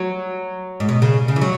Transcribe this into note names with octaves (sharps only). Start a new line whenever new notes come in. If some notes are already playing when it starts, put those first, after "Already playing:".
Already playing: F#3
G#2
B2
C#3
C#3
E3
F#3